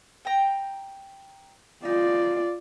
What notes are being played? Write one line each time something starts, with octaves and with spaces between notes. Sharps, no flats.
G5 A#5
D#4 F4 D5